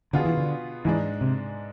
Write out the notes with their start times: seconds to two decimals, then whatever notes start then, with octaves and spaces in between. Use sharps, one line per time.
0.13 B2 D3 B3 F4 G#4
0.25 E3
0.37 D3
0.85 G#2 E3 G#3 D4
1.21 C3